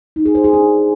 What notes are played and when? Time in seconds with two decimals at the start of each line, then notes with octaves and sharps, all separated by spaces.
0.16 D#4
0.25 G#4
0.35 C5
0.44 G#4
0.53 D4